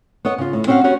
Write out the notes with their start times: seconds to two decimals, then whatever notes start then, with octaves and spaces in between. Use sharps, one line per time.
0.25 B3 C#5 D#5
0.38 C#3 F4
0.53 A2
0.67 C4 C#4 F#4 B4 F5 F#5
0.84 B3 C#4 F#4 G4